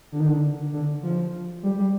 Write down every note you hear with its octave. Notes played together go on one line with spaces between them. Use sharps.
D3
D#3
D3
D3
F3
G3
G3